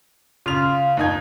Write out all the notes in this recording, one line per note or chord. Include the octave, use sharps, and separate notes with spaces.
C#3 F4 F7
D#2 D#4 G#6